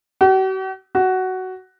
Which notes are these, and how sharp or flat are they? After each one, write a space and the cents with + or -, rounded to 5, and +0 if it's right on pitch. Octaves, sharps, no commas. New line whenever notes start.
F#4 +45
F#4 +10